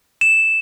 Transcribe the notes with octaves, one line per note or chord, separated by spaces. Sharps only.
E7